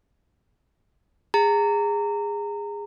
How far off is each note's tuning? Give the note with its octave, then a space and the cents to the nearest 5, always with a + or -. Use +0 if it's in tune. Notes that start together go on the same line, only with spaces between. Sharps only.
G#4 -20 A#5 -25